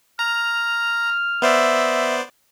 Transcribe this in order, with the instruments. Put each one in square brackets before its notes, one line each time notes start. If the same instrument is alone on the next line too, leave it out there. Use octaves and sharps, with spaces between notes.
[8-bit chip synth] A#5 [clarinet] F6
[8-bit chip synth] B3 C5 D5 [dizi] E5